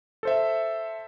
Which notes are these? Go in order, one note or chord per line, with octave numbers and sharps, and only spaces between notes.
A4 C5 E5